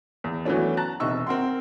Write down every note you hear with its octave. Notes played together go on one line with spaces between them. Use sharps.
E2
E3 F#3 A3 B3 C#4 D4
A5 A#5 F#6 A6
E1 C3 D#4 C#6 E6
C4 A#4 F#5 C6